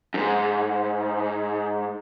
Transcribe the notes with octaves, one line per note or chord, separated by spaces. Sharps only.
F2 G#2